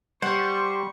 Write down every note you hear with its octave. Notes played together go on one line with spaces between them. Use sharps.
G3 C5 F#5 C#6